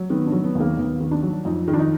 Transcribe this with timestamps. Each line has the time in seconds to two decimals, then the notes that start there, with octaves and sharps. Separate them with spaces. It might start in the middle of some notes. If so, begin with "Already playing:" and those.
Already playing: F#3
0.10 D#3 B3
0.27 D4
0.32 F#3
0.44 B3
0.55 D#2
0.60 A#3
0.77 D#2 B3
1.00 D#3
1.11 D4
1.23 F#3
1.45 F2 D#4
1.68 D#3
1.73 D4
1.79 D#4